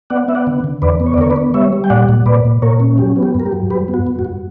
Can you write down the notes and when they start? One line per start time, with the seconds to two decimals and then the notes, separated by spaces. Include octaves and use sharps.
0.10 B3 D5 F#5
0.28 B3 E5
0.35 D5 F#5
0.47 D3
0.64 D3
0.82 E2 B4 D5
1.00 B3
1.06 C#5
1.14 D5
1.18 D3 A#4 C#5
1.30 B4 D5
1.36 B3
1.54 G3 C#5 E5
1.73 G3
1.84 G5
1.90 A#2 D5 F#5
2.09 A#2
2.26 A#2 B4 D5
2.45 A#2
2.62 A#2 A#4 C#5
2.80 C#4
2.98 F#3 G4
3.16 B3
3.23 G4
3.35 G2
3.40 A#4
3.46 G4
3.52 F#3
3.70 G2 G4 B4
3.88 B3
3.94 F#4
4.07 G2
4.19 F#4
4.25 G2